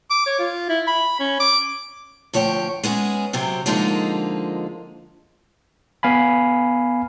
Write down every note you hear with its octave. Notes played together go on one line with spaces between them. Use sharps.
D6
C#5
F4
E4
B5
C#4
D6
D2 F3 C#5 E5 G5
G#3 B3 C#4 G#4
C3 F#3 C4
D3 F3 G#3 A#3 D#4 F4
B3 F5 G#5 B5